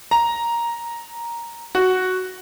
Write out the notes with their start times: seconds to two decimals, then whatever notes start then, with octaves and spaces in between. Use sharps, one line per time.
0.11 A#5
1.75 F#4